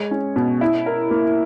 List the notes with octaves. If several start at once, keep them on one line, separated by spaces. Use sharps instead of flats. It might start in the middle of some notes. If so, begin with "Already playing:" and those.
Already playing: G#3 C#5
C#4
B2
E4
A#4
A#3